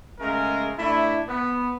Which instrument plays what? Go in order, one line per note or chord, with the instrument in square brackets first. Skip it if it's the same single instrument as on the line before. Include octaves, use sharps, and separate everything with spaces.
[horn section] C#3 G#3 A3 G#4 A#4
A3 D4 E4
B3